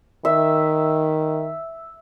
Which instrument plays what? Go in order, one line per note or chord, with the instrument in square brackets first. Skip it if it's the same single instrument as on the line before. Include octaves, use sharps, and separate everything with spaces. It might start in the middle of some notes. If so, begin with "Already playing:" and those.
[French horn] D#3 [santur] E5